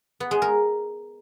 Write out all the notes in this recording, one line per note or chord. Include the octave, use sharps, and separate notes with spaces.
B3
G#3
A#4